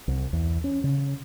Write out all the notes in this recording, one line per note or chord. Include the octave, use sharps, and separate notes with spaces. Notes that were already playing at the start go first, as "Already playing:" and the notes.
C2
E2
C#4
C#3